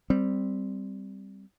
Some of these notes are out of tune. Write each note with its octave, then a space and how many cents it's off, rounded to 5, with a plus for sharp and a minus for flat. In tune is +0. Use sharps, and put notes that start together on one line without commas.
G3 +0 C4 -5